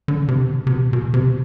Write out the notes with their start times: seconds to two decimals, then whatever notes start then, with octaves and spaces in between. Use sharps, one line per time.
0.08 D3
0.28 C3
0.67 C3
0.71 B2
0.93 B2
1.14 C3